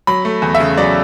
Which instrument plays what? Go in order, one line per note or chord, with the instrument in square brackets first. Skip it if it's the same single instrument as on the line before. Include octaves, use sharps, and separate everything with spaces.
[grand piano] F#3 B5
A3
E2
E5
C#3
F#3 D5